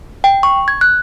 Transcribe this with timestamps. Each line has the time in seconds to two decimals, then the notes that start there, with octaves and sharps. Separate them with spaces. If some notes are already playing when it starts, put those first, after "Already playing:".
0.24 G5
0.43 C#6
0.68 G#6
0.81 F#6